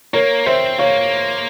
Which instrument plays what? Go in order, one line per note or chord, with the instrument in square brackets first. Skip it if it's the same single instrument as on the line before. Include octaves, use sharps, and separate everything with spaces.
[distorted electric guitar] A#3 [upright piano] A#4 C#5
[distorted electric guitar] C4 [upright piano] C5 E5
[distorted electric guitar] A#3 [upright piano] C#5 F5